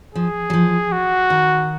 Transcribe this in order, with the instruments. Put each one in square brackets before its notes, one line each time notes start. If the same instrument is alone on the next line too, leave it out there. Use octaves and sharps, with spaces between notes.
[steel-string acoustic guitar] F3 [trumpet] G#4
[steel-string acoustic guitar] F#3
F3
[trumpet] F#4
[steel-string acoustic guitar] D#3